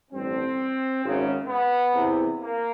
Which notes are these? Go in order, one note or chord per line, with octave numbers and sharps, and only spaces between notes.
A1 G2 D3 C4
G#1 F#2 C#3
B3
E2 C3 E3
A#3